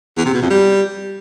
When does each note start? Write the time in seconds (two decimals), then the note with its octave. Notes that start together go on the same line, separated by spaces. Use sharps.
0.17 E2
0.26 C3
0.34 B2
0.42 F2
0.50 G3